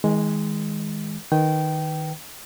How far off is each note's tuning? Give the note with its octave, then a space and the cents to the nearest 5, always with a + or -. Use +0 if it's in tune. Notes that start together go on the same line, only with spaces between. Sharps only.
D#3 +40 G#3 +0
D#3 -5 B4 +0 G5 -15